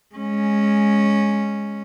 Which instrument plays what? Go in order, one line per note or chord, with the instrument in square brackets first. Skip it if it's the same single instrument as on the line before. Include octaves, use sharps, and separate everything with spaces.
[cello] G#3 C#4